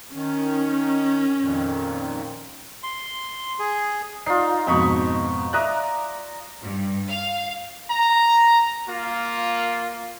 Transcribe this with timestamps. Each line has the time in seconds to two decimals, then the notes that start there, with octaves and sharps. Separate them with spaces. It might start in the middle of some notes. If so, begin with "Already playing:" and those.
0.15 D#3 C#4
1.41 F2 A#2 D#3
2.83 C6
3.59 G#4
4.26 D#4 F4 D5 C7
4.67 F2 G#2 B2 D#4 B5 C#6
5.53 D5 E5 A#5 D#6 F#6
6.61 G2
7.09 F5
7.90 A#5
8.89 A#3 F4